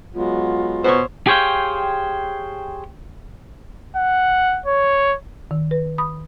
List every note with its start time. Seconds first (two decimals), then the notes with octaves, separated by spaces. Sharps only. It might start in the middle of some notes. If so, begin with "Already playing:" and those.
0.14 F#3 G#3 B3 F4
0.84 B2 C5 C#5
1.27 G4 G#4 C5 C#5 F5 G5
3.96 F#5
4.66 C#5
5.51 D#3
5.71 B4
5.98 B5 D#6